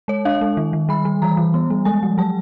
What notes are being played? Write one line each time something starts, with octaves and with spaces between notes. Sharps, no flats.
G#3 C#5
D4 F5
G#3
D#3
D#3
G3 B5
G3
E3 A#5
E3
B3
G3
G#3 G#5
F3
F#3 A5